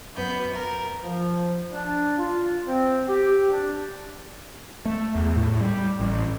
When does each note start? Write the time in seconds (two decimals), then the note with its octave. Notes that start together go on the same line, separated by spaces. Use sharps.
0.14 F#2 B3 G6
0.53 A#4
1.03 F3
1.71 D4
2.17 F4
2.67 C4
3.09 G4
3.51 D4
4.85 A3
5.15 E2
5.36 A2
5.61 G3
6.00 A1